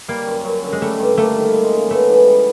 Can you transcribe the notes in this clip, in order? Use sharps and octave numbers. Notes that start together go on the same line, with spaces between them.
G3 A#3
F#2
F#2
D3
G#3
G3 A3
G2
A3 A#3
D#3
G#3
C#3
A3 B3
E3
G3